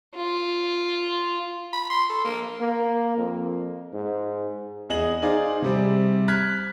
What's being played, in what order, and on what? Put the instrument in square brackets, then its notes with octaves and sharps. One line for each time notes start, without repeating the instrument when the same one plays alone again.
[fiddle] F4
[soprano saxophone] B5
C6
A4
A#3
[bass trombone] A#3
F2
G#2
[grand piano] E2 G#4 D#5 F#7
D#4 G#4 C5 D5 F5
C3 G3 C4
F6 F#6 G#6 B6